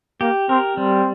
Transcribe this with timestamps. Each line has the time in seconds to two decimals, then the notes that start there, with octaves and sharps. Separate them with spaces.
0.21 A#3 G4
0.49 C4 A#4
0.77 G3 C4